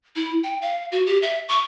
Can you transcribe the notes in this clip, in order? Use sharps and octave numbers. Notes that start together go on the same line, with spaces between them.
E4
G5
F5
F#4
G4
E5
C#6